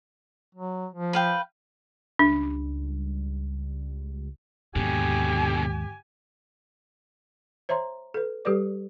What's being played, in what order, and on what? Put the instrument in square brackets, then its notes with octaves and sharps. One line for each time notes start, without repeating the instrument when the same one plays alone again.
[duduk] F#3
F3
[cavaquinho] B4 F5 G5
[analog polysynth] C#2 G3 [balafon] D4
[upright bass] D#2 G#2 [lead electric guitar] B2 D3 [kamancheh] G4 G#5
[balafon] C5 C#5 E5 A#5 C6
A4 B4
G3 G4 A4 B4 D5 D6